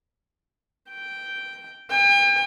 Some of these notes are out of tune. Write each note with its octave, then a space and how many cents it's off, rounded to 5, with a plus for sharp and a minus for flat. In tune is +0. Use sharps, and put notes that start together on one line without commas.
G5 -5
G5 +40